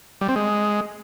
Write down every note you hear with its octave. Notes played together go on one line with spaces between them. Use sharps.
G3
C4
G#3